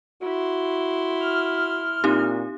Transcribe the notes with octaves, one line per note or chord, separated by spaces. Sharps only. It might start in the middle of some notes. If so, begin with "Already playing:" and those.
E4 F#4 C6
F6
A#2 C4 D#4 G4